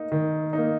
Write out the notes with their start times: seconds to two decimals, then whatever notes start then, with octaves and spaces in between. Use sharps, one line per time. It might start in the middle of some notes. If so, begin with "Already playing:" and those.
Already playing: A#3 D#4
0.12 D#3
0.53 A#3 D#4